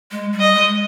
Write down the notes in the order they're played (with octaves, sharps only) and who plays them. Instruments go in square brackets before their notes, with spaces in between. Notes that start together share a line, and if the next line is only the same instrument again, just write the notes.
[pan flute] G#3
G3
[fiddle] D#5
[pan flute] G#3